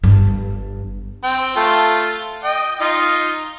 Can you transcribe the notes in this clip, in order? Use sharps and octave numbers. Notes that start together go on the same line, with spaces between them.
G1 G2
C4 G5
A3 F4 A4
D#5 G5
D#4 F4 D#5